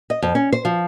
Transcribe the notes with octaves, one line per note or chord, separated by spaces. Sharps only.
D#5
F2
C#4
C5
F3